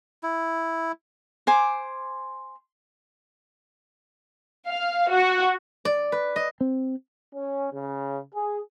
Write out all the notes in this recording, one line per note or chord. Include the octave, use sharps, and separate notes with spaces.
E4
C5 G#5 D6
F5
F#4
D5
B4
D#5
C4
C#4
C#3
G#4